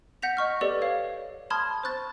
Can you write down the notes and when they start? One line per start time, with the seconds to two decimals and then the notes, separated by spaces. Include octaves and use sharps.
0.22 F#5 G6 A#6 B6 F7
0.37 D#5 C#6 F6
0.61 G4 A4 B4 D5 D#5
0.82 C#5 F5
1.50 A5 B5 C6 D#6 F6 G#6
1.83 C5 C#6 F#6 A6